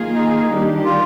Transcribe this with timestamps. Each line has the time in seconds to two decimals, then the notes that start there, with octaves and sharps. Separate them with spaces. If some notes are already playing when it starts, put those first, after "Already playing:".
Already playing: D#3 A#3 F4 G#4
0.15 D#4
0.49 D#3 G3 D4 G4
0.84 F4